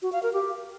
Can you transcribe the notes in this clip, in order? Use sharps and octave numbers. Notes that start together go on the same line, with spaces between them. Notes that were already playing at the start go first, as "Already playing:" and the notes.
F#4
F5
A#4
G4